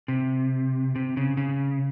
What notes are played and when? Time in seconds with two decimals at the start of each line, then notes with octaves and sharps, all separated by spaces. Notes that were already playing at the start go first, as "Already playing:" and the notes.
0.08 C3
0.96 C3
1.17 C#3
1.37 C#3